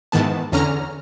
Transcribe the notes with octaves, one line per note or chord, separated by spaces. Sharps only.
G#2 D#3 E3 B3 A5
E2 D3 C#4 A#5 F6